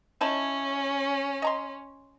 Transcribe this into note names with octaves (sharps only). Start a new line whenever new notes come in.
C#4 D#4 E4 A5
D#5 A#5 C6